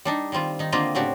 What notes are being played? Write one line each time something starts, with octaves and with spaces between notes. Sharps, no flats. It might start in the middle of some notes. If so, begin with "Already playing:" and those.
G3 D4 D#4
D#3 G3 C4 F4
D#3 D#4
D3 A#3 C4 F4 G4 D#5
A2 C#3 C4 D4 F#4 G4